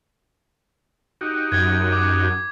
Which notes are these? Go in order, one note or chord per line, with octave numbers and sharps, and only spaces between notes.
D#4 F#4 G4
F#2 G#6
D6